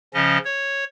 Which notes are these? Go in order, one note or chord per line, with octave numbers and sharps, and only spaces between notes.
C#3 F3 C#4 D#5
C#5